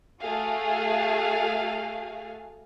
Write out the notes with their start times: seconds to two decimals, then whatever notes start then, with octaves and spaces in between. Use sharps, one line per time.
0.20 A3 F#4 G#4 A4 F5